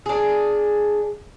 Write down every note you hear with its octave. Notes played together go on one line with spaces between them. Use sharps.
D4 G#4